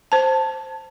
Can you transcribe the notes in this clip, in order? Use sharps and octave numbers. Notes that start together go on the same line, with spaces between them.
C5 A5